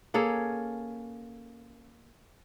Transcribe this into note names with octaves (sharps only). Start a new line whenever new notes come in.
A#3 C#4 G#4 A4